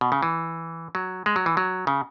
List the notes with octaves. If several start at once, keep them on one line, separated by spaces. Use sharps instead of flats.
B2
C#3
E3
F#3
G#3
F#3
E3
F#3
C#3